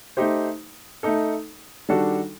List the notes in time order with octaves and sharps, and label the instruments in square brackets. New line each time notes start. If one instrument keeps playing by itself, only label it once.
[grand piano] A3 D#4 G4 C5
A3 D#4 A4
D#3 G3 D4 F#4 A4